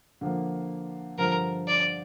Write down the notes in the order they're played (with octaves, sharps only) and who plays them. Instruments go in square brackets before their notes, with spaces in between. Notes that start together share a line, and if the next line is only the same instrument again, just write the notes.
[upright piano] D3 F3 A#3
[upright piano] G2 D3 F3 [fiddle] A#4
[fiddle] D5